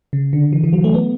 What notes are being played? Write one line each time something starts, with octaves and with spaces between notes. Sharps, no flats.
C#3
D3
E3
E3
F#3
A3
B3